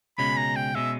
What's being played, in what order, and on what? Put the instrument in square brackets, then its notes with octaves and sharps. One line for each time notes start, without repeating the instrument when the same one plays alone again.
[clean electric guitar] C#2 B2 G#3 C#4 [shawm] B5
[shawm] A#5
G5
[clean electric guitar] B2 G#3 C#4 [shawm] E5